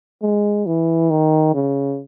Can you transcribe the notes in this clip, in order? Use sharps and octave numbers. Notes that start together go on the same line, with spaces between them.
G#3
E3
D#3
C#3